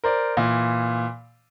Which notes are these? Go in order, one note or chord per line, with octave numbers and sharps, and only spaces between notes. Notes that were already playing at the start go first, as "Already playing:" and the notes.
A#4 C5 D5
A#2 E3